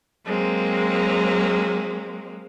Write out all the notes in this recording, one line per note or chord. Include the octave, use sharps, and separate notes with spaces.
F#3 G#3 A#3 C4